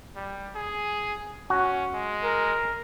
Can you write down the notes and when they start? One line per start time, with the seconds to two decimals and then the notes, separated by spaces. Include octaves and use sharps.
0.16 G3
0.55 G#4
1.50 C#4 F#4
1.93 G#3
2.23 A#4